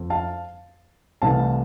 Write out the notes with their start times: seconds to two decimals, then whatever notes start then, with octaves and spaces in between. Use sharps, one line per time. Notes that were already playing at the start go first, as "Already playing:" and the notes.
Already playing: F2
0.10 F5 A5
1.22 C2 C3 E3 A3 F5 A5